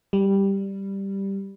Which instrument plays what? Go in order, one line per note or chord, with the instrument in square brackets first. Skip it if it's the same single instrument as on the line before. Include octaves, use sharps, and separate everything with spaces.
[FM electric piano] G3